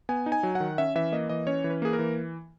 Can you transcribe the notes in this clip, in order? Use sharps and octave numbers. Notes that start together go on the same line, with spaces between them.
B3 G#5
D#4
G#5
F#3
D#3 F#5
C#4 E5
E3 E5
A#3 D#5
E3 D#5
C#4 C#5
E3
B4
A#3 G#4
A#4
E3